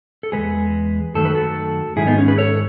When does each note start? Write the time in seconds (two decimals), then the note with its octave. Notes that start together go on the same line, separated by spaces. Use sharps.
0.23 A4
0.32 D#3 G#3 G#4 B4
0.37 E2
1.14 F#2 D#3 F#3 A3 A4
1.25 B4
1.35 F#4 A4
1.96 G#2 D#3 F#3 E4 G#4
2.07 B3 D#4
2.18 C#4
2.28 G#4 B4
2.38 A4 C#5